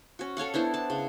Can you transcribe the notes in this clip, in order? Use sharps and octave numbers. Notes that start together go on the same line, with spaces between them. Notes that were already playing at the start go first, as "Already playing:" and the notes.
C#4 F#4
A4 C#5 F5 F#5
B3 D4 E4 C5
D5 A5
C#3